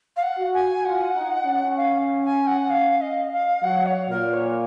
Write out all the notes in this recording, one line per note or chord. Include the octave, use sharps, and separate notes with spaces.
F5
F#5
F#4
G#5
F4 F#5
D#4
C#4
F5
G#5
F#5
F5
D#5
F5
F#3 F#5
C#5
A#2 A#4
C#5